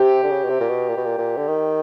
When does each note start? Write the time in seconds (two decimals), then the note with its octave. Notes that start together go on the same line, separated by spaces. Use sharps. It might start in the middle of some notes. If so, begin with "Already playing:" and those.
Already playing: C3 G4
0.24 D3
0.31 C#3
0.44 B2
0.50 C3
0.61 A#2
0.70 B2
0.89 A#2
0.97 B2
1.05 A#2
1.18 A#2
1.37 D3
1.48 D#3